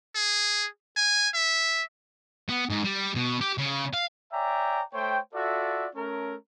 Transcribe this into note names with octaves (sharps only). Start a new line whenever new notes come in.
G#4
G#5
E5
B3
G#2
G3
B2
G4
C#3
F5
C#5 D5 E5 G5 G#5 A#5
A3 C5 C#5 G5
F4 F#4 A4 D5 E5
A3 C#4 A#4